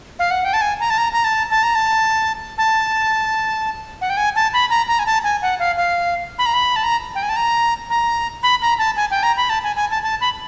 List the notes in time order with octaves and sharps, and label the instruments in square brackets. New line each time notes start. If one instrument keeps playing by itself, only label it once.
[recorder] F5
F#5
G5
A5
G#5
A#5
A5
A#5
A#5
A5
A5
A#5
A5
A5
F#5
G5
G#5
A5
B5
A#5
A#5
G#5
A5
G#5
F#5
F5
F5
B5
A#5
B5
A5
A#5
G5
G#5
A5
A#5
A#5
B5
A#5
A5
G#5
G5
A#5
B5
A5
G#5
G#5
A5
A5
B5